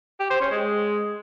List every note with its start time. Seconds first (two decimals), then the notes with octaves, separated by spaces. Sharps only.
0.20 G4
0.30 C5
0.41 C#4
0.51 G#3